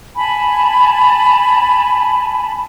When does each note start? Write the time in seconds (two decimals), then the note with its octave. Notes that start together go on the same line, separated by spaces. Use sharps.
0.17 G#5 A5 B5